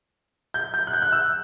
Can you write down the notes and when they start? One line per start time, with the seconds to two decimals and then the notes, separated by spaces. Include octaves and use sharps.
0.54 G6
0.74 G6
0.87 F#6
0.93 G6
1.02 F#6
1.12 E6